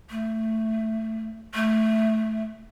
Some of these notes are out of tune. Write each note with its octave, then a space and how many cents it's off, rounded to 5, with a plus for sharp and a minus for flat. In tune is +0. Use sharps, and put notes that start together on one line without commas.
A3 +10
A3 -5